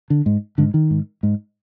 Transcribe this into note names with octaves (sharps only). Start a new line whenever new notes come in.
D3
G#2
G#2 D3
D#3
G#2
G#2